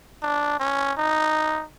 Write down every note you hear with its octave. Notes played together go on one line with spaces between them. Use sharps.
D4
C#4
D#4